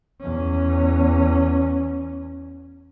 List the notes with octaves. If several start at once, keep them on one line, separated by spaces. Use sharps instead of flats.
E2 C#4